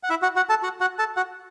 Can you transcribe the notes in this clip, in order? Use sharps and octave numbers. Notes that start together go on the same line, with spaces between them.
F#5
E4 E5
F#4 F#5
F#4 F#5
A4 A5
F#4 F#5
F#4 F#5
A4 A5
F#4 F#5